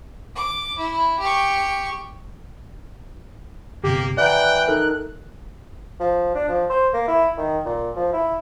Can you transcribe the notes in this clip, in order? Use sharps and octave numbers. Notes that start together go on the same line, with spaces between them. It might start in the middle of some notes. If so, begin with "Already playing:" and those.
D6
E4
G4 C#6
G1 C3 A#3 G4
E3 D5 F#5 G5 A#5 F#6
D#4 A4 A#4
F3
D4
F3
C5
A#3
E4
D#3
A#2
F3
E4